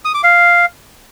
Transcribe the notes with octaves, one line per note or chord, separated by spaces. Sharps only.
D#6
D6
F5